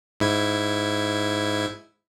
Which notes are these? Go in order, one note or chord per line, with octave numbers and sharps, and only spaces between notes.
G#2 E4 G#6